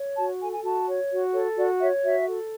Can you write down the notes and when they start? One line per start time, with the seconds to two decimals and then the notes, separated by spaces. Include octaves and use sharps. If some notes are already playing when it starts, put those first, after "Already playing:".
Already playing: C#5
0.17 F#4 A5
0.40 A4 G#5
0.54 G#5
0.64 F#4 A5
0.87 C#5
1.11 F#4
1.33 A4 C#5
1.56 F#4 D5
1.80 C#5 E5
2.03 F#4 E5
2.27 A4